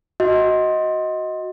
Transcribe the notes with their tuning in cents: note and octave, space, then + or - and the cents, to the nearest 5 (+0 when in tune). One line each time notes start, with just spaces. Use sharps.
F#4 +0 D#5 +15